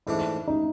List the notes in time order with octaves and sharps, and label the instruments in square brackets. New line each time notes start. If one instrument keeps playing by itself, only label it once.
[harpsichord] G#2 E3 A3 D4 [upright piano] E4
[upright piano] D#4